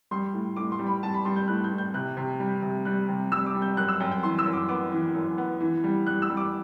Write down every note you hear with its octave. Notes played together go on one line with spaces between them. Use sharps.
G3 C6
A2
A2 D6
C6
G3
B5
G3 A5
B5
G3 C6
G6
A2 F#6
G6
A2
G6
C3 F#6
C3
G3
C3
G3 F#6
C3
G3 E6
D6
G3
G6
F#2 F#6
E6
F#2 G5
G5
E3 C6
E6
F#2
D6
B3 D6
E3
F#2
B3
E3
G3
G3 F#6
E6
G3
D6